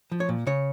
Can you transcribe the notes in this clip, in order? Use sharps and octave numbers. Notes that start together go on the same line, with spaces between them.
F3
C#5
A#2
C#3 C#5